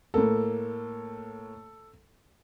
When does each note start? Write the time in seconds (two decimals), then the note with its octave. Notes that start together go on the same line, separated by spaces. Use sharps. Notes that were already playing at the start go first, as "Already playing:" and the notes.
0.14 A2 A#3 A4